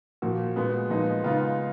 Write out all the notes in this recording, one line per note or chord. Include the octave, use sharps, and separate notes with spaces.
A#2 F3 A#3 F#4
A#2 G#3 B3
A#2 F3 G#3 B3 D#4
C#3 G#3 B3 D#4 F4